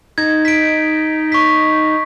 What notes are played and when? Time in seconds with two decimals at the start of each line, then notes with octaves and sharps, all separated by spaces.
0.18 D#4 G#6
0.45 B6 D7
1.32 C#6 B6